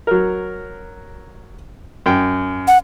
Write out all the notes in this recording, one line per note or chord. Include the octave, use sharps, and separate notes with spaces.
F#3 A#4
F#2 G5
F#5